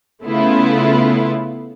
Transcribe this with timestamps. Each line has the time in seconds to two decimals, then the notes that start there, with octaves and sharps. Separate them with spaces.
0.24 C#3 A3 B3 E4 F4